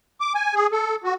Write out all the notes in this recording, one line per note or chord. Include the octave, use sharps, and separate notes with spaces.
D6
G#5
G#4
A4
F#4